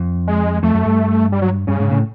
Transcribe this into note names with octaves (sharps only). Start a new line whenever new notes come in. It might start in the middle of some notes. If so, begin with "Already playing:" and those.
Already playing: F2
G#3
F2 A3
F#2
G2
G3
F#3
G2 C#3
G#2
A2